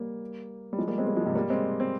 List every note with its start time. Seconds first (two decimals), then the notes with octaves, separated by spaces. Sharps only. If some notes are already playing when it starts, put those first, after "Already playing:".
Already playing: G3 A#3
0.73 G3
0.78 F3 G#3
0.88 G3 A#3
0.98 G#3 C4
1.07 G3 A#3
1.16 F3 G#3
1.26 G#2 C3
1.35 G3 A#3
1.50 G#3 C4
1.80 C4